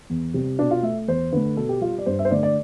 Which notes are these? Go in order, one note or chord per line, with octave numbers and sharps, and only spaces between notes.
E2
C3 G3
B2 D4
F4
A3 E5
E2 C5
D3 A3 B4
B2 A4
G4
G3 F4
D5
G2 C5
E5
C5
D3 A3 D5
D5